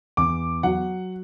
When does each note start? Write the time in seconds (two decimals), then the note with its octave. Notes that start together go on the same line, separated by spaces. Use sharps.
0.17 E2 D6
0.63 F#3 F#5